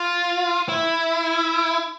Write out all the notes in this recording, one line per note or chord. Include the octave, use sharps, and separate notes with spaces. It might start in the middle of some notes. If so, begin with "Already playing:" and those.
Already playing: F4
E4